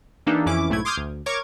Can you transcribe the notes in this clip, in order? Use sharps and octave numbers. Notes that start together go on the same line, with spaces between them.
E3 A#3 D4 D#4 G4 A4
F2 E3 C#4 E4 D6
B1 G#2 A3 E4 G#6
C6 D6 D#6 F6 G6 G#6
D2
A#4 C#5 C#6 D6 G#6